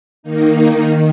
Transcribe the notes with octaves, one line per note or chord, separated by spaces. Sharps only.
D#3 A#3 D#4
D#3